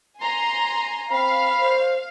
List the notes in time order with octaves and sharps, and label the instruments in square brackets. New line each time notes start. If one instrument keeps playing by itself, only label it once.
[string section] G#5 A#5 C6
[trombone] C4 [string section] F5 [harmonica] B5
[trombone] C5